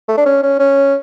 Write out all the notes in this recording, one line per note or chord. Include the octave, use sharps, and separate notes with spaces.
A3
D4
C#4
C#4
C#4